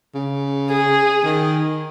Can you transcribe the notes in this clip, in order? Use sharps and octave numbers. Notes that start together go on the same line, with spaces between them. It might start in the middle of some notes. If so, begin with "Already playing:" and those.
C#3
G#4
D#3